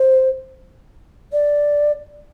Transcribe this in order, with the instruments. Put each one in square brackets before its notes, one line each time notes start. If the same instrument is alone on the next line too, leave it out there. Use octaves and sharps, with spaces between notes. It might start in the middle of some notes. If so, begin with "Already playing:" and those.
Already playing: [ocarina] C5
D5